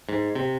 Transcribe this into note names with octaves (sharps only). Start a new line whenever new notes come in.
G#2
C3